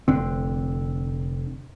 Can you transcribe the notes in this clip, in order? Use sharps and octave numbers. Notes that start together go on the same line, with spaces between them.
F1 D3 C4